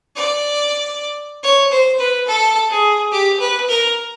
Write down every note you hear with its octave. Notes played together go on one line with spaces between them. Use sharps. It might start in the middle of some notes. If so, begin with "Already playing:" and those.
D5
C#5
C5
B4
A4
G#4
G4
B4
A#4